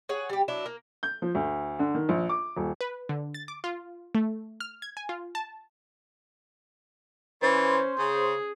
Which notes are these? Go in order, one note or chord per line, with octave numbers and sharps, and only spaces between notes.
G#4 C#5 F#5
G3 G4
F#3 D4 E4
A#3
G6
F3
D2
D3
D#3
A#1
D6
D#1
B4
D3
A6
D6
F4
A3
F6
G#6
G#5
F4
A5
E3 C#4 C5
C#3 G#4